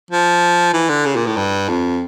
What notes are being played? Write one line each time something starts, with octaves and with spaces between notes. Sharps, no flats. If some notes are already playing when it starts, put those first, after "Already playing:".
F3
E3
D3
C#3
A#2
A2
G2
F2